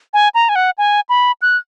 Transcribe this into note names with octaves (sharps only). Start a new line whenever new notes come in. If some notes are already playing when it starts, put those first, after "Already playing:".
G#5
A#5
G#5
F#5
G#5
B5
F#6